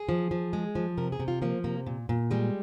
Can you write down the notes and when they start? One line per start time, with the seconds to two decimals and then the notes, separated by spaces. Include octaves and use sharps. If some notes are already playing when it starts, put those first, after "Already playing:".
Already playing: G#4
0.09 F3
0.31 F3
0.53 G#3
0.75 F3
0.98 C3 A#4
1.12 G#4
1.20 C3
1.28 F4
1.42 F3 A#3
1.64 C3 A#3
1.86 A#2
2.09 A#2
2.31 G3 G#3